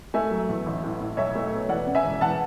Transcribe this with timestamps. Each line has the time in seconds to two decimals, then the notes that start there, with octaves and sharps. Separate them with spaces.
0.14 A3 E5 G#5
0.31 F#3
0.49 E2
0.66 A1
0.84 A2
1.00 A2
1.17 B1 C#5 E5
1.35 A3
1.53 B2
1.69 E3 D5 F#5
1.87 C#3
1.95 E5 G#5
2.04 E1
2.21 E3 F#5 A5